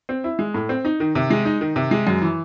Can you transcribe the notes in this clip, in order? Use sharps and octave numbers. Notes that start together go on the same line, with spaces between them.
C4
E4
G#3
A2
C4
D#4
D#3
C3
G#3
D#4
D#3
C3
G#3
F#2
E3